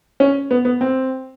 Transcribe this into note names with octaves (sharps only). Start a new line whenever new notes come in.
C#4
B3
B3
C4